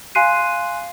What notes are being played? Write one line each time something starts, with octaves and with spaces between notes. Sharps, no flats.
F5 G#5 C6 F#6 C7 D#7